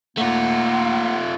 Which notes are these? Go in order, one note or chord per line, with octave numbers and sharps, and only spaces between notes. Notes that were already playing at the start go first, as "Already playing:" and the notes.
A3 A#3 F4 F#5